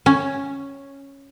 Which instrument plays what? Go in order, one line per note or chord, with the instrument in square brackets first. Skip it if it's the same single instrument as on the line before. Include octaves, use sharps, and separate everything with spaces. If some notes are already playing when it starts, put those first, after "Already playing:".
[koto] C#4